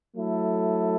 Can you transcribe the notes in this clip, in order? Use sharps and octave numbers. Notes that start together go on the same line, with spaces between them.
F#3 A3 E4 A4